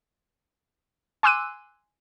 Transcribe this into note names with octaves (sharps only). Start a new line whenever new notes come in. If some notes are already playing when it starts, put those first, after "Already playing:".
G#5 C6 D6 E6 F#6 D#7